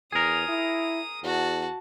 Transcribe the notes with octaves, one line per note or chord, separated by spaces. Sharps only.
E2 G#4 A#4 D#6
E4
E2 F#4 A5